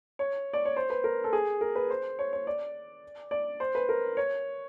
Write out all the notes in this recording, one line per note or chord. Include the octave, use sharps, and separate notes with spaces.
C#5
D5
C#5
C5
B4
A#4
A4
G#4
A#4
B4
C5
C#5
C#5
D5
D5
C5
B4
A#4
C#5